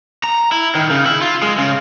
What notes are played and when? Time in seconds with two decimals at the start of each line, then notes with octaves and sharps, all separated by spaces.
0.24 A#5
0.52 E4
0.75 D#3
0.91 C#3
1.06 E4
1.22 F4
1.42 G#3
1.58 C#3